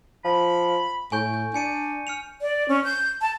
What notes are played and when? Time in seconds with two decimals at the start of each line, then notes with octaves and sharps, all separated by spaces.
0.24 F3 B5
1.12 A2 G#5 C#6 G6
1.34 G6
1.54 D4 G#5 C#7 D#7
2.07 F6 C#7 F7
2.42 D5
2.69 C#4
2.84 G6
3.21 A5